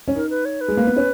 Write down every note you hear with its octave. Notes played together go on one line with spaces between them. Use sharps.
C#4
D#4 A#4
B4
C#5
B4
G#3
A#3
B3
C#4